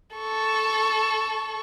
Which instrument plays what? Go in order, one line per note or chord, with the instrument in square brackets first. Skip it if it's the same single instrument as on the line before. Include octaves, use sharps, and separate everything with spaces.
[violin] A4 C#6